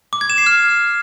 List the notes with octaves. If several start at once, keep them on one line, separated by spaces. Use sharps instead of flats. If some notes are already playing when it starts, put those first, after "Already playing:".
D6
G#6
E7
C7
F6